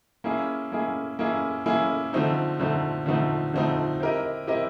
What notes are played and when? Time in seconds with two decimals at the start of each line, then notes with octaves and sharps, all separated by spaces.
0.24 A#3 C#4 E4 G#4
0.72 A#3 C#4 E4 G#4
1.19 A#3 C#4 E4 G#4
1.66 A#3 C#4 E4 G#4
2.13 D3 F3 A3 C4 D#4
2.60 D3 F3 A3 C4 D#4
3.06 D3 F3 A3 C4 D#4
3.53 D3 F3 A3 C4 D#4
4.01 C4 E4 G4 A#4 D#5
4.47 C4 E4 G4 A#4 D#5